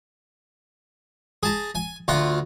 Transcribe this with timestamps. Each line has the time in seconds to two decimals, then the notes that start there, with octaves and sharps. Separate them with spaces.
1.43 G#4 A5 A#5
1.75 G#5
2.08 D2 F4 F#5 A#5